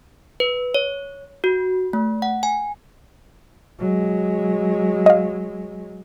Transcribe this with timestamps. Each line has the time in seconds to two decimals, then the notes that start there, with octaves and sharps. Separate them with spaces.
0.40 B4
0.74 C#5
1.44 F#4
1.93 A3
2.22 F#5
2.43 G#5
3.79 F#3 G#3
5.06 D#5 F5